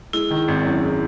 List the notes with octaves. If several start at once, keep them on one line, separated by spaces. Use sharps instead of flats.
G#3 E4
D#3
G#1
F#2
G#3